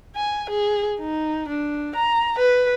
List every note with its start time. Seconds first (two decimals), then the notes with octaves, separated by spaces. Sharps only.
0.16 G#5
0.50 G#4
1.00 D#4
1.49 D4
1.96 A#5
2.39 B4